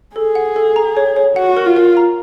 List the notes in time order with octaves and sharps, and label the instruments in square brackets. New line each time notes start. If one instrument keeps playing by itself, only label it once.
[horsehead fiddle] G#4 [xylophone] A4
[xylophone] F#5
A4
A#5
C#5
C#5
[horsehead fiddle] F#4 [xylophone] F#5
[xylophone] A#4
[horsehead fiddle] F4
[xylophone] A#4
A#5